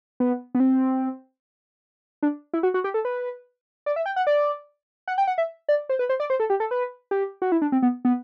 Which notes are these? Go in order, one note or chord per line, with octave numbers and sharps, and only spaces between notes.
B3
B3
C4
D4
E4
F#4
F#4
G4
A4
B4
D5
E5
G5
F#5
D5
F#5
G5
F#5
E5
D5
C5
B4
C5
D5
C5
A4
G4
A4
B4
G4
F#4
E4
D4
C4
B3
B3